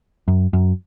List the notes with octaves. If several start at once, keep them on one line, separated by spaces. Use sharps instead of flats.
F#2
F#2